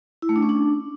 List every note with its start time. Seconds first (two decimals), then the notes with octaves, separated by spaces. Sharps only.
0.22 E4
0.29 A3
0.36 D4
0.42 C#4
0.49 D4